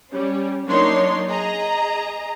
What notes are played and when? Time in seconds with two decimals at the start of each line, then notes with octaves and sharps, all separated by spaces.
0.13 G3 C#4
0.66 F#3 A#3 D4 D#4 C#5 C6
1.29 G#4 D#5 A#5